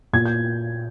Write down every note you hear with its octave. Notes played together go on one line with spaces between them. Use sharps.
A#2 G#6
G6